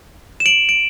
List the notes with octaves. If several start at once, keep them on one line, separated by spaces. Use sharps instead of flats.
E7
D7 F#7
D7